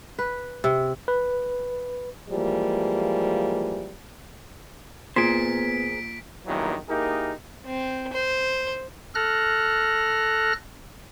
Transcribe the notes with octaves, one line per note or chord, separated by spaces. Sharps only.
B4
C3
B4
E3 F3 G3 G#3 A#3
A#2 B3 G#4 A#4 C5 B6 D7
E2 G2 A#2 D#3 E3 F#3
A#3 D#4 E4 G4 G#4 A#4
C4
C5
A4 F6 F#6 A#6